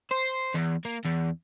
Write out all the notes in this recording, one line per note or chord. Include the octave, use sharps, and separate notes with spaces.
C5
E2
A#3
E2